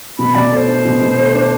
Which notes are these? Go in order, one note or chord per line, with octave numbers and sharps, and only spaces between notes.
B2 B5
B2 D5
A3 C5 D5
D4
B2
B2
A3
D4